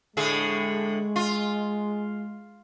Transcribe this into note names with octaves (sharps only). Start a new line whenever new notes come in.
A2 D3 G#3 G#4
F4